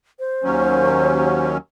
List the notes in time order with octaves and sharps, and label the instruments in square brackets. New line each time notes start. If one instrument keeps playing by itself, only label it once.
[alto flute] C5
[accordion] D#2 F#3 C#4